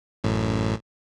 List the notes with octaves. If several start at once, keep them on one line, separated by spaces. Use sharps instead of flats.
A1 F#2 A2